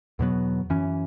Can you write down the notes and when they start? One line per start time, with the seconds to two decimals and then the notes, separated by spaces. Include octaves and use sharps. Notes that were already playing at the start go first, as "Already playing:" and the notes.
0.19 E2 B2 F#3 B3
0.70 F#2 E3 C#4